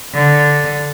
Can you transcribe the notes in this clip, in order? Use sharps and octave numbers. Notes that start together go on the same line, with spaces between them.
D3